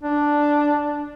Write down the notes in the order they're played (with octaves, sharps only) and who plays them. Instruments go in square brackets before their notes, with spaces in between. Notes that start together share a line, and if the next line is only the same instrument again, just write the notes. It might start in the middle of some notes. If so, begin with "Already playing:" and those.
[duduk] D4